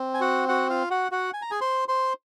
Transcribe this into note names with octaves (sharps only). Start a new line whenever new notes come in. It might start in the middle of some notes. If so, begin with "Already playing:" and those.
Already playing: C4
G#5
F#4 F#5
F#4 F#5
F4 F5
F#4 F#5
F#4 F#5
G#5
A#5
G#4 G#5
C5 C6
C5 C6